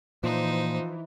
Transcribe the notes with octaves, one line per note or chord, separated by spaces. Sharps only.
A#2 E3 F3 D#4 C5